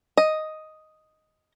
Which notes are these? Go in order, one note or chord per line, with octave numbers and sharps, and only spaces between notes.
D#5